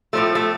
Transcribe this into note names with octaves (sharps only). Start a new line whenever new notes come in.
A2 F3 A3
A3